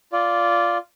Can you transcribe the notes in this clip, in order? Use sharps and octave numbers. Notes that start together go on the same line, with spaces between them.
F4 D5